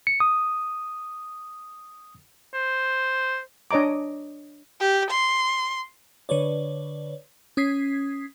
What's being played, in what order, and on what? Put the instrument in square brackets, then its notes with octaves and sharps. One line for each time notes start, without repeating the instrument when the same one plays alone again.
[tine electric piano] C#7
D#6
[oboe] C5
[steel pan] D4 C#5 D#5 A#5 D6
[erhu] G4
C6
[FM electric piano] D3 B4 C#5 D5
C#4 D#6 G#6 B6 C7